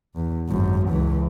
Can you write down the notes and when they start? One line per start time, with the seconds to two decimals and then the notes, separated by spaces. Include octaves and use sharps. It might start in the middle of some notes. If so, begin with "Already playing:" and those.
0.15 E2
0.48 G#1 F#2
0.89 C#2 E3